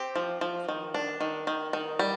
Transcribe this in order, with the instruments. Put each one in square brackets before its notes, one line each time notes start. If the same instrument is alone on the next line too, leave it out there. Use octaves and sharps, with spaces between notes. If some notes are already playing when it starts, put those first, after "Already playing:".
Already playing: [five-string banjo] C4 G4
F3
F3
D#3
D4
D#3
D#3
D#3
G3